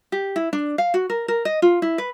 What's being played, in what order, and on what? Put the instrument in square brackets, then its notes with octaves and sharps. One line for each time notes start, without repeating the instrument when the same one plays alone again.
[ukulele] G4
E4
D4
F5
F#4
A#4
A#4
D#5
F4
E4
B4